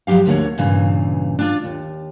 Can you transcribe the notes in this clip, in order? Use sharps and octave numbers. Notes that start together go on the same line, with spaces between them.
F3 F#3 C#4 G4 F5
D2 D3 A#3 C#5
G2 A#2 C#3 E3
D4 F4 D5
D#2